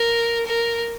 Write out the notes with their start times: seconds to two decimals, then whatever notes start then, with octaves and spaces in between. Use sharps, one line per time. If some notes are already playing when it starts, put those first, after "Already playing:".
Already playing: A#4
0.46 A#4